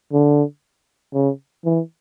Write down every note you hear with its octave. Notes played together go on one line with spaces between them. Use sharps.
D3
C#3
E3